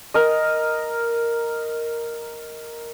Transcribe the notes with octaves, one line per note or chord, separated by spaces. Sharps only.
A#4 D#5